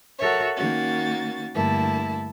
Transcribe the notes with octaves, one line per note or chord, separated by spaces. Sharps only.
F#4 A4 A#4 C#5 E5
D#3 A#3 C#4 F#4 A6
G2 D3 A3 A#3 E4 A5